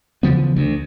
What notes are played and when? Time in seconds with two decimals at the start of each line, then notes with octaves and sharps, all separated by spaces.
0.23 C#3 E3 F3 B3
0.56 D2